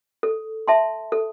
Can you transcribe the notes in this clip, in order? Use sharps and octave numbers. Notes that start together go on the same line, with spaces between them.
A4
E5 A5 C6
A4